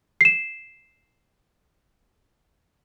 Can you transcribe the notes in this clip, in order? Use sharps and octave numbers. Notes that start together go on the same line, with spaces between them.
C7 E7